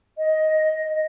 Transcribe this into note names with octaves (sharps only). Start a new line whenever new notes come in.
D#5